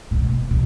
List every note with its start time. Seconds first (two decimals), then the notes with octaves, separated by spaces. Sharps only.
0.11 A#2
0.19 B2
0.51 B2